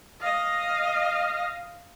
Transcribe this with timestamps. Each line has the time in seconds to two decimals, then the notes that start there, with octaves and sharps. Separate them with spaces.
0.21 D#5 F5